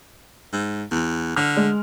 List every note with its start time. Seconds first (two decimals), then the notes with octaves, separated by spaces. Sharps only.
0.53 G#2
0.91 E2
1.36 D3 F6
1.57 G#3